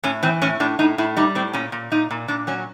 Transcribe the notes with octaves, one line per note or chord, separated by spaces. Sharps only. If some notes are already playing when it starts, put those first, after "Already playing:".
A2 C#4
E3 C4
A2 C#4
A2 D4
A2 D#4
A2 E4
G3 D#4
A2 C4
A#2 C#4
A#2
A#2 D#4
A#2
A#2 D4
F#3 C#4